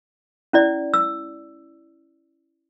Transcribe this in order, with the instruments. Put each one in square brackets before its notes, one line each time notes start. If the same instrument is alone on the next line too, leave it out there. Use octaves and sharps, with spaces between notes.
[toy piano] C#4 E4 D5
E6